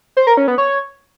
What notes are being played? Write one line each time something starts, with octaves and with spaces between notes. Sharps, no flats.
C5
A#4
C#4
B3
C#5